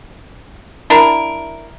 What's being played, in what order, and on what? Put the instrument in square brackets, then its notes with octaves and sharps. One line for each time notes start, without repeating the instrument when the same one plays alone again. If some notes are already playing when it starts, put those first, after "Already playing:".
[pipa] D4 E4 A#4